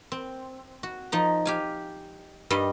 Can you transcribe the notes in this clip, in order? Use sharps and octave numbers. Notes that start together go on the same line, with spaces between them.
C4
F#4
F3 D#4 A#5
G4 F5 G#5
G2 G3 D#5